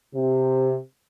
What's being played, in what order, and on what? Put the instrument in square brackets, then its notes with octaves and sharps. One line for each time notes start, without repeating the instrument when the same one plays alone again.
[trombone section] C3